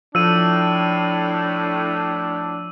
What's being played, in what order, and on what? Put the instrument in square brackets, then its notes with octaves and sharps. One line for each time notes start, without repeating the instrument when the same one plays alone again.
[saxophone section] A2 [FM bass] F3 [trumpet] D4 [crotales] E6 D#7